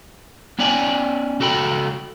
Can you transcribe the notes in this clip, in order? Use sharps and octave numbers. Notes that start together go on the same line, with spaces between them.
B3 C#4 C#5 D5 G5 G#5
C#2 F#4 A4 G5 B5